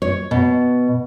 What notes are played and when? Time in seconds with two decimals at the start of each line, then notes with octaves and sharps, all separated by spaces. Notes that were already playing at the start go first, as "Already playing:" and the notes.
0.02 C#5
0.31 B2